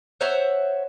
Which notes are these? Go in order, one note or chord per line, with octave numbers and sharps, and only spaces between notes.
C5 C#5 E5 F#5